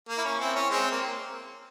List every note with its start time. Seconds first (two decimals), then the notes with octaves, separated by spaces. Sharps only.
0.09 A#3
0.18 E4
0.25 C#4
0.40 C4 E4
0.56 C#4
0.70 G#3 C4
0.91 A#3